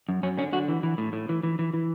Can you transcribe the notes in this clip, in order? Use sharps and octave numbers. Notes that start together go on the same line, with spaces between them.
F#2
F#2 C#4
D3 C#4
D3 F#4
E3
E3
A2
A2
E3
E3
E3
E3